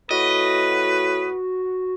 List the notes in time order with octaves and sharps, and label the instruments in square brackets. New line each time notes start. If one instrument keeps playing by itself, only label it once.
[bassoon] A2 [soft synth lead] F#4 [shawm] B4 [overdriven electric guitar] D#5